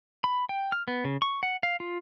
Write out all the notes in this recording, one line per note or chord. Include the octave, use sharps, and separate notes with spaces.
B5
G5
F6
B3
C#3
C#6
F#5
F5
F4